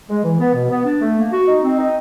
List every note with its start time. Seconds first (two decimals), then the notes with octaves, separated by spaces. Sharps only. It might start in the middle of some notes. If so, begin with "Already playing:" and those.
0.08 G#3
0.24 E3
0.39 B3
0.54 B2
0.70 B3
0.85 D4
1.00 A3
1.16 A#3
1.32 F#4
1.47 D#4
1.63 C4
1.78 D#4